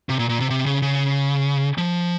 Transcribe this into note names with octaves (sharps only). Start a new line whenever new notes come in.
C3
A#2
A#2
C3
C3
C#3
C#3
F3